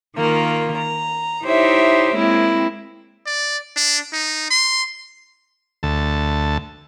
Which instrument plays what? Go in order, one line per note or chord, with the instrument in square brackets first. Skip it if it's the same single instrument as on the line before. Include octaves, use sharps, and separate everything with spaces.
[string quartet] D#3 A#3 F4
A#5
D#4 E4 G4 C5 C#5 E5
G#3 A#3 C4 E4
[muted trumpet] D5
D4
D#4
C6
[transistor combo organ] D2 A5